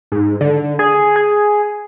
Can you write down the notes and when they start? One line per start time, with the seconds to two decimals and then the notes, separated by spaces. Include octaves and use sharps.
0.12 G#2
0.41 D3
0.79 G#4
1.16 G#4